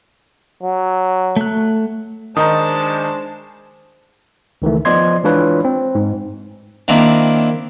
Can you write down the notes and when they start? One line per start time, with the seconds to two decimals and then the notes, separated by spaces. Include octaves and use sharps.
0.63 F#3
1.36 A3 F#6
2.37 D#3 G#3 D4 D#4 C5 A5 A#5 D#6
4.62 C#2 D#3 E3 A3
4.85 F3 B3 D5 D#5 C6 G#6
5.24 E3 G#3 D4 F4 B4 C#5
5.65 C4
5.95 G#2
6.88 D#3 A#3 C4 D4 E4